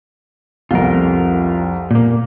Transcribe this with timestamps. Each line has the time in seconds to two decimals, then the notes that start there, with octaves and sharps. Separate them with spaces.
0.71 C2 F2 F4 A#4
1.91 A#2 A#3